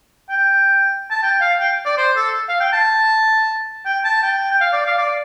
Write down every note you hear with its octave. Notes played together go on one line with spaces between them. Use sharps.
G5
A5
G5
F5
G5
D5
C5
A4
F5
G5
A5
G5
A5
G5
G5
F5
D5
F5
D5